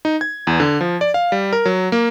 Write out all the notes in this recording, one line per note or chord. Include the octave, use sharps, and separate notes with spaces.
D#4
G#6
E2
D3
F3
D5
F5
G3
A#4
F#3
A#3